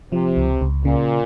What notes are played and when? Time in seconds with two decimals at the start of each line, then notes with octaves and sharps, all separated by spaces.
0.12 C3 F3
0.37 C#2
0.61 C#2
0.85 A#2 C#3